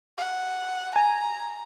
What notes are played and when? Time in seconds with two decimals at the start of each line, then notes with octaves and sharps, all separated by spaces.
0.18 F#5
0.96 G#5 A#5